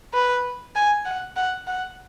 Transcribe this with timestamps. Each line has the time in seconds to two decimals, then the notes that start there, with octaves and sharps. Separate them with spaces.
0.14 B4
0.76 G#5
1.06 F#5
1.36 F#5
1.67 F#5